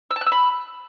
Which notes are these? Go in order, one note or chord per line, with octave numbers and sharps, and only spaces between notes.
E6
A5
F#6
E6
B5